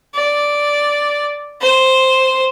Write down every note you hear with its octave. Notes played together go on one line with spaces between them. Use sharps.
D5
C5